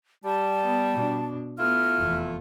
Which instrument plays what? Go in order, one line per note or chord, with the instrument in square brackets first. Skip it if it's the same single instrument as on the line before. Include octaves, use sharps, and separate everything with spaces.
[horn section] G3 [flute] A5
[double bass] B3
B2 D4
[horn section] A3 E4 F4 [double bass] B3 [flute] F6
[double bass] F1 E2